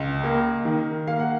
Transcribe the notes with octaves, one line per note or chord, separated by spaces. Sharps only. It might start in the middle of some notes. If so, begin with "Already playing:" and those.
Already playing: C#2
A#3
D#3
A#3 F5
F#5